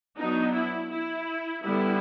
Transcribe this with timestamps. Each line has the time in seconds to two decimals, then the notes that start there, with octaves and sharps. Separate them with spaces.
0.18 F#3 B3 D4 D#4
0.53 E4
0.90 E4
1.62 D3 G3 B3 E4